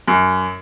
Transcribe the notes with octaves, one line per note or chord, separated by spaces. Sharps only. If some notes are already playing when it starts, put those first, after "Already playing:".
F#2